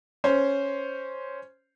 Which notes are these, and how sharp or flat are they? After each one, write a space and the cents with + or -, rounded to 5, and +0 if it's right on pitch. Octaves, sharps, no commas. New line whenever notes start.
C#4 +0 C5 -5